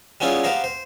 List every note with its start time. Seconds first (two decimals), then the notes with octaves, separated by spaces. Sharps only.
0.20 G3 B3 C#4 E4 F4 G#4
0.44 B3 G4 C5 F5 A#5
0.64 C5